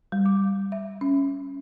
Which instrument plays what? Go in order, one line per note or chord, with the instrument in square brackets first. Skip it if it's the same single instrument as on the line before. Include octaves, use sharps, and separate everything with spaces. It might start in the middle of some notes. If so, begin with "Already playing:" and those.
[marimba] G3
D6
E5
C#4